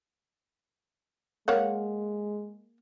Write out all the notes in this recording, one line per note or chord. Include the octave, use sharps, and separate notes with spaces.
G#3 A#3 C#5 F#5